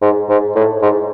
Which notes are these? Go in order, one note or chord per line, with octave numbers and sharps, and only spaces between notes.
G#2
G#2
A2
G#2